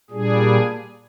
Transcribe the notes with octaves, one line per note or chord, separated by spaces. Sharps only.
A#2 G3 D4 G#4